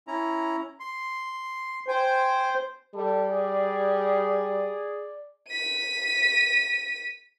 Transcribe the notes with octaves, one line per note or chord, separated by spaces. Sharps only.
C#4 E4 A#5
C6
C5 G5 G#5
G3 A4
G#4 D5
B6 D#7